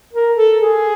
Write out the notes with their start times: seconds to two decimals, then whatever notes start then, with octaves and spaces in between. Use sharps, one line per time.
0.13 A#4
0.37 A4
0.61 G#4